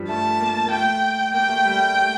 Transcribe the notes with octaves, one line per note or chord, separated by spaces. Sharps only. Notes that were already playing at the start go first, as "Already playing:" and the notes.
Already playing: G2 F3 G3
A3 A5
A#3
A#3
A3 G5
A#3 G5
A3
G3
A3
A3